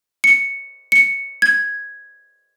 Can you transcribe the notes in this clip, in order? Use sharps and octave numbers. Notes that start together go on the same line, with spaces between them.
C#7
C#7
G#6